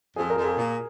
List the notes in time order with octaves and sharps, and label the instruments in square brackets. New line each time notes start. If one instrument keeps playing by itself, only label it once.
[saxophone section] F2 [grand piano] G#4
[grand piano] A#4
[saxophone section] F2
[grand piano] G#4
[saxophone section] A#2